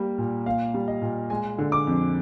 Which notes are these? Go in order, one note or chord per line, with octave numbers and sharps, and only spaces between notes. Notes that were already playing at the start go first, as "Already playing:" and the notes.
Already playing: G3 A#3
A#2
A#3 F5
G3
D#5
A#2
G#3 G#5
D3
D6
F2